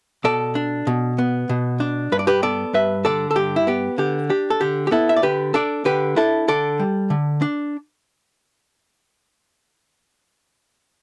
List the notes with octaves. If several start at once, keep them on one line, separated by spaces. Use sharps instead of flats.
B2 A4 D5
D4
B2
B3
B2
D4
G2 B4
D5
G4 B4
B3 A4 D5
G2 B4 E5
D3 A4 D5
A4
G2 G4
E4
B3 G4
D3 G4
D4 G4
A4
D3 G4
G4
B3 E4 A4
E5
D5
D3 G4 B4
D4 A4 D5
D3 G4 B4
D4 E4 A4
D3 A4 D5
G3
D3
D4